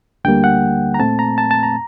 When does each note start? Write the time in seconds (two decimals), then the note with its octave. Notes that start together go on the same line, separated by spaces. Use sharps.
0.24 D2 D3 G3 A#3 G5
0.44 F#5
0.94 A#5
1.00 A#2 A3 C4 A5
1.19 A#5
1.38 A5
1.51 A5
1.63 A#5